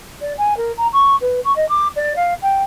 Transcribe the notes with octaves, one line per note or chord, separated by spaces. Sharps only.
D5
G#5
A#4
A#5
C#6
B4
C#6
D#5
D6
D5
F5
G5